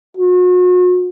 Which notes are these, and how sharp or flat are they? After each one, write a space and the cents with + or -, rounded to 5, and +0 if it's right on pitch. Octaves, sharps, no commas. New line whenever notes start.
F#4 -40